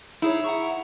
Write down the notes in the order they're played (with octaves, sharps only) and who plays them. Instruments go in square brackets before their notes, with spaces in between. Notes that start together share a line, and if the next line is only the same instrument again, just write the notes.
[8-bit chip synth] D#4 G#4 C#5 [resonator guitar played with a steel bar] E4
[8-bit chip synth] F#5 A#5 C#6